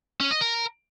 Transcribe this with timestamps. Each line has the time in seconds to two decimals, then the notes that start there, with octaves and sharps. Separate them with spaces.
0.20 C#4
0.31 D#5
0.41 A#4